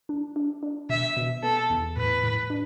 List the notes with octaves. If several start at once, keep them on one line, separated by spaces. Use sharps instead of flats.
D4
D4
D4
B2 E5
B2
B3 A4
E2
A2 B4
A2
D4